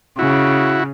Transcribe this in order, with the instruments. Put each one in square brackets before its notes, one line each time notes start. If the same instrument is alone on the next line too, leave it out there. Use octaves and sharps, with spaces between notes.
[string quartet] C#3 [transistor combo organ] E4 F#4